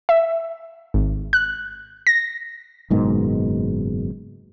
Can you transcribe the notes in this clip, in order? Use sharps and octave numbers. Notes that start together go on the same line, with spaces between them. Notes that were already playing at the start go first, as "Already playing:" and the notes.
E5
G#1
F#6
A#6
F#1 G#2 B2 D#3